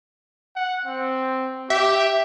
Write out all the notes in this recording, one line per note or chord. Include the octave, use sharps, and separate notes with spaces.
F#5
C4
G4 E5